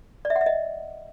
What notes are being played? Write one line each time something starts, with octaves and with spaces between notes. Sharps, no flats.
D5
E5
F#5
E5
D#5